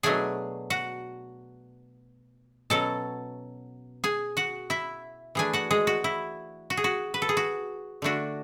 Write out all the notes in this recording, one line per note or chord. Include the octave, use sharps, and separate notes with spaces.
B2 F#3 A3 D4 G#4 G#5
F#4 F#5
B2 F#3 C#4 A4 A5
G#4 G#5
F#4 F#5
E4 E5
E3 A3 D4 G#4 G#5
F#4 F#5
G#3 G#4
F#4
E4
F#4
G#4
F#4
B4
A4
G#4
F#4
D3 A3 D4 F#4